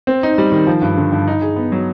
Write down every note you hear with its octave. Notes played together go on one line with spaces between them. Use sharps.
C4
D#4
G3
D#3
F3
G2
D3
G2
D#4
G#4
B3
F#3